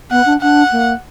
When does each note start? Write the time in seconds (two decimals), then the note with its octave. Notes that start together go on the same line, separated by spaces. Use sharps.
0.11 B3 F#5
0.26 D4
0.41 D4 F#5
0.72 A#3